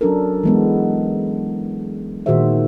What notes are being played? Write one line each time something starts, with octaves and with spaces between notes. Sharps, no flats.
F#3 C#4 D4 A4 A#4
E3 G#3 B3
A#2 D#3 F#4 G#4 C5 E5